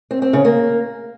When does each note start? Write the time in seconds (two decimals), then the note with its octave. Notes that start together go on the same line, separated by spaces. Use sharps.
0.11 C4
0.22 C4
0.33 C#3
0.45 A#3